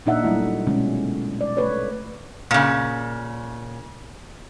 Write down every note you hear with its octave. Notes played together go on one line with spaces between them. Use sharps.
A#2 D4 D#4 E5 F#5
F#3 G3 A3 E4
B2 D3 G#3 C#4
D5
A3 B4 C#5
A#2 C#3